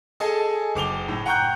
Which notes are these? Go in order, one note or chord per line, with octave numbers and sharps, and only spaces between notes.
G#4 A4 D#5 G#5 A5
F#1 D6 F7 G7
A2
F#5 G5 A#5 C#6 F#6 G6